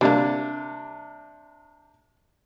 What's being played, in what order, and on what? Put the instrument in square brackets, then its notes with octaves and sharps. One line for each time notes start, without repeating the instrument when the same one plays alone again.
[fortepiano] C3 D4 [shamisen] G3 A#3